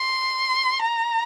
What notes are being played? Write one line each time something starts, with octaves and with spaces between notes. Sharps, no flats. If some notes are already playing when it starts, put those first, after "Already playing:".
Already playing: C6
A#5